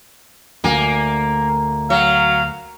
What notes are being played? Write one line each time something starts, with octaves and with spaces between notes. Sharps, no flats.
D2 A#3 G#5
F#3 F5